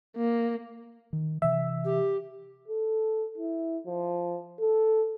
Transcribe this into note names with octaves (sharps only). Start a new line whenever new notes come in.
A#3
D#3
C3 E3 E5
G4
A4
E4
F3
A4